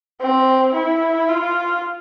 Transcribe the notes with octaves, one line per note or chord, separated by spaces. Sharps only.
C4
E4
F4